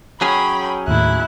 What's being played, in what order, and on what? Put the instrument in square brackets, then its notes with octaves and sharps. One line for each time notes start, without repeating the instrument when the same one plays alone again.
[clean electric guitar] F#3 C#4 G#4 [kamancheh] C#5 G5 [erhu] B5
[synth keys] D#2 A2 [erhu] E4 [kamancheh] F#6